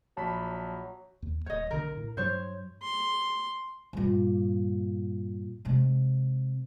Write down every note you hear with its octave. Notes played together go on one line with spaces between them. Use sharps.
A#1 F#3 A5 B5 B6
D#2
D1 C#5 D#5
B1 D3 A#4
A2
G2 F#3 C5 C#5
C6
G2 A#2
C3 G#3